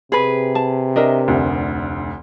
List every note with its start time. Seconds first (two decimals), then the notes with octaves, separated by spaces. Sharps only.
0.12 C3 G#4 B4
0.55 A5
0.96 D4 A#4 D#5 E5
1.28 F1 D2